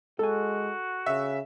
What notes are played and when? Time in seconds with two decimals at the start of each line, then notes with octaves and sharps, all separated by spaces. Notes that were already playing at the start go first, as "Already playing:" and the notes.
0.19 G#3 F#4 A4 G#5
1.06 C#3 E5